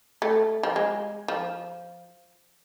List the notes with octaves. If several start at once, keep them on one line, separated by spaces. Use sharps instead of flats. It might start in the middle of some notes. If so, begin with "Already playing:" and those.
A3
F3
G#3
F3